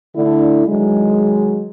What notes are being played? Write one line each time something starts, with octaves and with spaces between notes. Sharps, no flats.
D3 A3 D4 E4
D#3 F#3 G#3